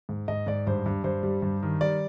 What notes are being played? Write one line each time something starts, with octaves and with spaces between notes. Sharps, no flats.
G#2
G#2 D#5
G#2 D5
G2 C5
G2
G2 C5
G3
G2
D#3
G3 D5